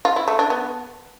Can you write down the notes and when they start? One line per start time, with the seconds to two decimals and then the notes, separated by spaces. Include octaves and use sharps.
0.05 F4
0.16 E4
0.28 A3
0.39 D4
0.50 B3